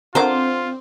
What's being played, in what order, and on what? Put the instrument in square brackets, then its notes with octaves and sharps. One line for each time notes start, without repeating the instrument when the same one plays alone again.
[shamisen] D3 G3 A#4 [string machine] C4 [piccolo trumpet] F4 [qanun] C5 D6